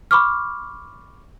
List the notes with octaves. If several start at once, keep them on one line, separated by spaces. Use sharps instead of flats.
B5 C#6 D6 F6